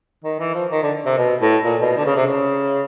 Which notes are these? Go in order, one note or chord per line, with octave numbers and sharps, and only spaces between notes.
D#3
E3
F3
D#3
D3
C3
B2
A2
A#2
B2
D3
C#3
C3
C#3